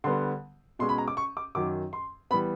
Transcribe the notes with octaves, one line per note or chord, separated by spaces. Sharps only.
D3 G3 B3 C6
B2 G#3 C#4 C6
B5
A#5
D6
C#6
D6
F#2 D#3 F#3 D6
C6
E3 G3 B3 B5